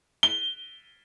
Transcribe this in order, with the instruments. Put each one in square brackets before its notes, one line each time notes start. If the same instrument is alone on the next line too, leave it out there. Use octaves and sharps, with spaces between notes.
[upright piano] G7